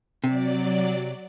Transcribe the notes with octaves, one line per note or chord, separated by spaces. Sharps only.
C3 F#3 D5